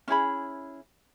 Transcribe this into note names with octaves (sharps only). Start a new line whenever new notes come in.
C#4 E4 G#4 B5